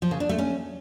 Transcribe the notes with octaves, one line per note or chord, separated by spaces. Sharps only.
F3
C#3
D4
A3
C#4